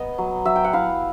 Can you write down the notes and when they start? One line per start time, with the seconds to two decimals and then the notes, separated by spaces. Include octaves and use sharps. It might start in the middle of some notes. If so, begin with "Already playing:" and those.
Already playing: B3 D#5
0.18 F#3
0.45 F#3 E5
0.56 G5
0.64 F#5
0.73 E4 F5